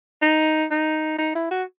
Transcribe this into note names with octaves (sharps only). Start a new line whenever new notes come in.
D#4
D#4
D#4
E4
F#4